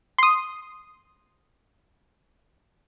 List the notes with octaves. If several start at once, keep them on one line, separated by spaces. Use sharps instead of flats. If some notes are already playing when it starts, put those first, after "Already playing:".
C6 D#6